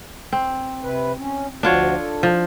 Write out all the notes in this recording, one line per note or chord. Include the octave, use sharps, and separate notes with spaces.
C4
C3 B4
C#4
D2 F3 D4 F4 F#4 C#5
A4
F3